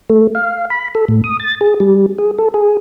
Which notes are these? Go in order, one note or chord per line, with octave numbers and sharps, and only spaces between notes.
A3
F5
B5
A4
A2
D#6
A6
G#4
G3
G#4
A4
G#4